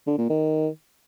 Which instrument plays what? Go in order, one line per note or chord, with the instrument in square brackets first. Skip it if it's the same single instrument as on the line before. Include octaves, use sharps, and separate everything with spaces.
[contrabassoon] D3
A#2
D#3